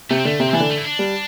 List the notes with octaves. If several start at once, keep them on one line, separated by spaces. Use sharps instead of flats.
C3 A3
C4
D3 A3
C3 C4
C4
E3 D4
D3
A3
E4
D4
G3